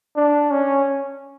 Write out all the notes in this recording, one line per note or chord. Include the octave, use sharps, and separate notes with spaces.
D4
C#4